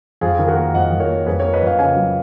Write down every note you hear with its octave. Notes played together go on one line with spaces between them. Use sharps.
F2 F4 G#4
D#3
F#4 A#4
A#3
F2 D#5 F#5
F2
A#4 C#5
A#3
F2 G#4 B4
A#4 C#5
A#3
B4 D#5
F2
C#5 F5
C#3 F5 G#5
F#3